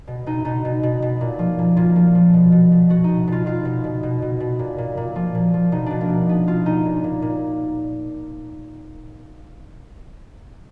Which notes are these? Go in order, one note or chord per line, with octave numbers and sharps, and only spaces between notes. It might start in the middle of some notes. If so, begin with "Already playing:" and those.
B2
B2 D#4
B2 D#4
B2
B2
B2
A#2
F3
A#2
A#2 F4
F3
F3
B2
B2
B2
B2 F#4
B2 D#4
B2 F4
B2 F4
B2
B2
B2
B2
B2
A#2
A#2
A#2
F3
A#2
F3
B2 D#4
B2 D4
A#3
B2
B2 B3
B2 F4
B2 D#4
A#2
A#2
A#2